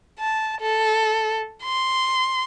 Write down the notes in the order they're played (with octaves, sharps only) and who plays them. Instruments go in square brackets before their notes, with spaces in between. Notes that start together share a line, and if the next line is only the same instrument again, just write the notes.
[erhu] A5
A4
C6